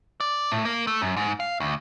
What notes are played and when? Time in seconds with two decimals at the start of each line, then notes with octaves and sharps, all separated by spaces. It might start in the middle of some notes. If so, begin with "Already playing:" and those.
0.20 D5
0.52 A2
0.65 A#3
0.87 A3
1.02 F#2
1.17 G#2
1.40 F5
1.60 D2